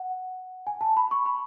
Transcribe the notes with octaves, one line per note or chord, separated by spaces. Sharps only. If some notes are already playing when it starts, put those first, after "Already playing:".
Already playing: F#5
G#5
A5
B5
C#6
B5